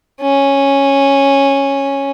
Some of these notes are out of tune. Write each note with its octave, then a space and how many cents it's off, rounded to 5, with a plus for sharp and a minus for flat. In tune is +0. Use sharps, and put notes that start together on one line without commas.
C#4 -5